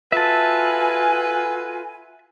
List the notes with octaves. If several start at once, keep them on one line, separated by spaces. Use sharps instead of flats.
F4 F#4 A4 B4 E5 G#5 A5